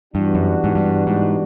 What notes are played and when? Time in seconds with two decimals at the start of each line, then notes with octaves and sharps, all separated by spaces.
0.14 G2 E3 G3 B3 D4 F#4
0.35 F#2
0.64 G#2
0.75 G2
1.07 G#2